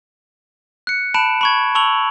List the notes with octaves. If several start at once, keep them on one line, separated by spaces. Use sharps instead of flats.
F#6 C#7
A5 B5 F#6 D7 E7
B5 C#6 G#6
A5 C#6 E6 F7 F#7